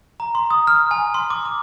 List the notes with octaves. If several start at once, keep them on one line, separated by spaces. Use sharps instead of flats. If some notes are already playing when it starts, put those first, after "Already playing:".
A#5
C6
D#6
F6
G#5
C6
D6
D6